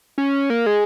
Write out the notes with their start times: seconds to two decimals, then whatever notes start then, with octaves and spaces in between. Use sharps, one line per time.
0.18 C#4
0.50 A#3
0.66 G#3